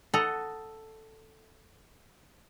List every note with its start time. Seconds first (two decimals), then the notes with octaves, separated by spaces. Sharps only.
0.14 A4 D#5 F#5 A#5